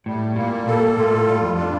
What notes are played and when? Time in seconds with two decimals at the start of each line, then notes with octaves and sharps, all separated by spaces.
0.06 A2 G3
0.36 A#2 A#3
0.67 A#2 A4
0.97 A2 F4
1.27 G3
1.42 F2
1.58 D4